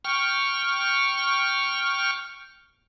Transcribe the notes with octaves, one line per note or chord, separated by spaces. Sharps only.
G5 C#6 F6